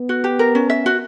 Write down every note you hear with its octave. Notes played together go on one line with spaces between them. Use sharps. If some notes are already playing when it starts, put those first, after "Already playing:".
Already playing: B3
F#4
G4
A#4
C#4
E5
F#4